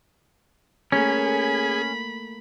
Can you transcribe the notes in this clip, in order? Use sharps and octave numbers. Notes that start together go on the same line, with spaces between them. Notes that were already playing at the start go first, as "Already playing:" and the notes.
A3 A#3 C#4 G#4 B5